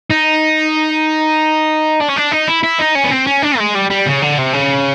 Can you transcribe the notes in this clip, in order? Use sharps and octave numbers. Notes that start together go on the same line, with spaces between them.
D#4
D4
C#4
D4
D#4
E4
E4
D#4
C#4
B3
C4
C#4
D4
G#3
G3
G3
C#3
D3
C3
C#3